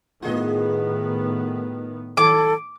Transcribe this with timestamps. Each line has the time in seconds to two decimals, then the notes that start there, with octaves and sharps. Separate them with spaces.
0.22 A2 D#3 B3 F4 G#4 D#5
2.17 D#3 F#3 A4 D6